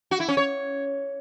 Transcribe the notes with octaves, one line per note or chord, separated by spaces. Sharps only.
F#4
E4
C#4
C#5